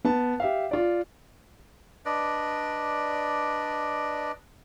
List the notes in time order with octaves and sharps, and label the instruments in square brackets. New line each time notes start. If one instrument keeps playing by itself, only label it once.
[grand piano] B3 A5
G4 E5 F5
F4 D5
[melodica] D4 B4 D5 D#5